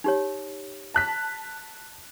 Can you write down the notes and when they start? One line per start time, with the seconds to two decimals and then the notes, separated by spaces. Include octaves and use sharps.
0.04 D#4 G4 C#5
0.94 A5 F#6 B6